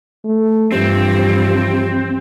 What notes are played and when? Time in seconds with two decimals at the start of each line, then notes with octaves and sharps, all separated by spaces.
0.25 A3
0.72 G2 E3 F3 C4 G4